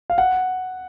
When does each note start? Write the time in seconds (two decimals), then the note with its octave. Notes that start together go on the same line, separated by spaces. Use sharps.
0.10 F5
0.18 F#5